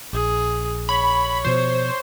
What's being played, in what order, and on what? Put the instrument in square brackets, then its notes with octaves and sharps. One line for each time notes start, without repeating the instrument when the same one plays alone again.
[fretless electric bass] A#1 [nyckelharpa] G#4
[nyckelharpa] C#5 [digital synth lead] B5
[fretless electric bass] B2 F3 [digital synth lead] C5